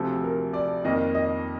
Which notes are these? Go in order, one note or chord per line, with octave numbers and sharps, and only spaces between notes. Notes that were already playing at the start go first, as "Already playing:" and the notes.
Already playing: D2 C3 F3 A4
A#4
D5
F2 D#3 A#3 D#5
D#5